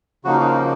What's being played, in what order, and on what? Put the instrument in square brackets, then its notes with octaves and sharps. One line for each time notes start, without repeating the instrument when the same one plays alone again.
[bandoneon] C#3 F3 A#3 D#4 F#4
F4
D#4
F4